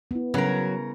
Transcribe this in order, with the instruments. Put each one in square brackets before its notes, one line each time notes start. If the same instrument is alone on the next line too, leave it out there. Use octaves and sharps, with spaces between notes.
[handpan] B3 E4
[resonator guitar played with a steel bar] C#3 A#4 [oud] F#3